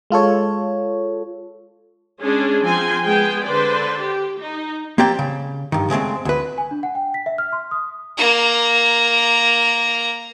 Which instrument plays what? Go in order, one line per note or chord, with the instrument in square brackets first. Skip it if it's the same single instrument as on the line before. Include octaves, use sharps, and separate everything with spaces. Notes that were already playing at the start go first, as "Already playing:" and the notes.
[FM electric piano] G#3 F4 A4 C#5
[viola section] G#3 C#4 D4 G#4
F3 C4 G#5 C6
G#3 B3 G#4 G5
D3 B4 C5 D5
G4
D#4
[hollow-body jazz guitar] A#3 C4 G4 D5 G5
C#3
G2 D#3
C#3 G#3 A3 C4
D2 B4
[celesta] G#5
D4
F#5
G5
B6
E5
F6
C6
D#6
[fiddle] A#3 A#5